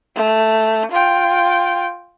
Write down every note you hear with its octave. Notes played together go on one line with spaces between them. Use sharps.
A3
F4 G5